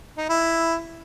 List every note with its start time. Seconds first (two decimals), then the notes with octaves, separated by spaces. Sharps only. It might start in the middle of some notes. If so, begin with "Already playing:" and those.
0.18 D#4
0.29 E4